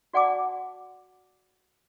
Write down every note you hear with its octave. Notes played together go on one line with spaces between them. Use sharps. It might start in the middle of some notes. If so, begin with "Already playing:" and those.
F#4 D5 F#5 G#5 A5 D6